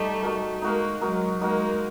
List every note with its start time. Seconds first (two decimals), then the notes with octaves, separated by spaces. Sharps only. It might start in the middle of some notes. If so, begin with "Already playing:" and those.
Already playing: G3 A3 D#4 G4
0.22 D#4 F#4 A#4
0.62 G#3 A#3 D#4 F#4 A#4
1.01 F#3 G#3 D#4 F#4 A#4
1.41 G#3 A#3 D#4 F#4 A#4